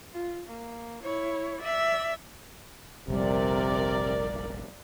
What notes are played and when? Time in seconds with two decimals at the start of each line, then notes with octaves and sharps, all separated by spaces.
0.13 F4
0.47 A#3
1.02 E4 C#5
1.61 D5 E5
3.08 F1 A#1 C3 G3 A#4 D5